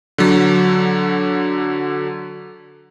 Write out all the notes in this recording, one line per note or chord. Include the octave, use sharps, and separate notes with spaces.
D3 F#3